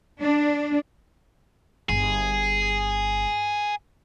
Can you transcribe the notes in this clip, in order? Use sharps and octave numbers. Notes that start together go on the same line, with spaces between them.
D4
G1 G#4